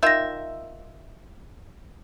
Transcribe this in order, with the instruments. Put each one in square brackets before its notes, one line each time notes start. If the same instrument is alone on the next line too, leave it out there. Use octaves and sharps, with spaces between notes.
[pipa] D#3 F4 E5 [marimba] G6 A#6